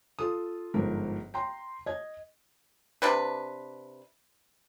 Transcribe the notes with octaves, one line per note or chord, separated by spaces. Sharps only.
F4 A4 D#6
G1 G#2 F3 A#4
G5 A#5 C6
D#5 G#6
C3 D4 B4